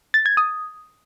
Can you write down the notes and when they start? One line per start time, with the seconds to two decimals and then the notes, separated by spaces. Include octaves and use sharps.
0.14 A6
0.26 G#6
0.37 D#6